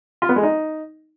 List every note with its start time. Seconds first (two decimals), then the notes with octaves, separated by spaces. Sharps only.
0.22 F4
0.29 B3
0.36 G#3
0.43 D#4